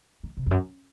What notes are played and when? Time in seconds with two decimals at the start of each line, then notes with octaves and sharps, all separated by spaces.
0.23 D#3
0.37 C3
0.46 F2
0.51 F#2